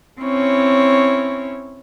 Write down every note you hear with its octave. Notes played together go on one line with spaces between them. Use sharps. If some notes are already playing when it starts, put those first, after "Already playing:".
C4 C#4 E4 C#5